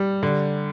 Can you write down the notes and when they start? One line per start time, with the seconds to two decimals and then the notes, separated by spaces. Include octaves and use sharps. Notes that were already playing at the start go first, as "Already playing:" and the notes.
Already playing: G3
0.23 D3